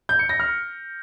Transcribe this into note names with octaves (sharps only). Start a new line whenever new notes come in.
G6
C#7
A#6
F6